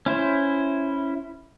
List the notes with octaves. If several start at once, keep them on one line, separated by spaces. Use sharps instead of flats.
C#4 E4 C5